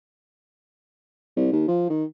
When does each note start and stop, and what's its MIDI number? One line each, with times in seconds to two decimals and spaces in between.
1.36 1.50 36
1.52 1.68 39
1.68 1.87 53
1.90 2.04 51